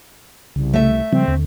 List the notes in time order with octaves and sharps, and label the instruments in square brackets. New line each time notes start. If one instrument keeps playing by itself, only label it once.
[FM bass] C2 [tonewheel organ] C#3
[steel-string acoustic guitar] A3 E5
[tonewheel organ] C#3 F3 G3 [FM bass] C4
[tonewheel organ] D#2 D3